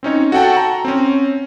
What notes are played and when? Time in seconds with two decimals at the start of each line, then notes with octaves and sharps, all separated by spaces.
0.03 C4 C#4 D#4 C#5
0.32 F#4 A4 F#5 G5 A5
0.57 A#5
0.85 C4 C#4